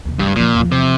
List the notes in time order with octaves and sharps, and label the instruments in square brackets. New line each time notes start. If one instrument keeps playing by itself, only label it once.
[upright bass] D#2 C3
[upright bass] F#1 D2 [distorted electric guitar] G2
[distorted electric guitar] A#2 [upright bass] D3 F3
[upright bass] E2 F3
[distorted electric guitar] C3